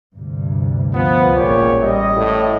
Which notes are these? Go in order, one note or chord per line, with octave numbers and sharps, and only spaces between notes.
D2 G2 C3
F3 B3
A1 A#2 G#3 G4 C#5
G3 D#5
A2